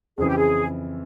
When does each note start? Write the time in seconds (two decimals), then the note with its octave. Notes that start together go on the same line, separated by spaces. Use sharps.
0.18 F2 C#3 E3 G#4
0.28 G4
0.37 G#4